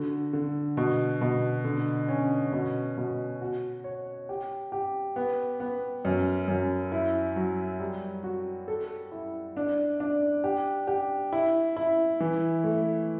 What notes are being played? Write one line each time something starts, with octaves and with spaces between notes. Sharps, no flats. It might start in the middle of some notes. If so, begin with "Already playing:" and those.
Already playing: D3 F#4
D3
B2
B2
D3
C#4
B2
B2
F#4
C#5
G4
G4
B3
B3
F#2
F#2
E4
F#3
G3
F#4
A4
E4
D4
D4
G4
G4
E4
E4
E3
A3